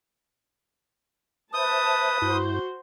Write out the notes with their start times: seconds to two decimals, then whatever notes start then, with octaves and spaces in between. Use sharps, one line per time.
1.54 B4 C5 E5 A5 D#6 G6
2.22 G2 E4 F#4 C5 G6